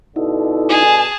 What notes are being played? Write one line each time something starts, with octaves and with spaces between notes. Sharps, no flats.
B2 D3 D#4 E4 A4
G#4 G#5 A5